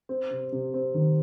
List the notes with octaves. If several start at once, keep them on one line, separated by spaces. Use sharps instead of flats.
C4
C3
C3
C4
D#3